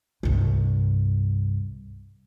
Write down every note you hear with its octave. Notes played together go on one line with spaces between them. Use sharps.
C2 G2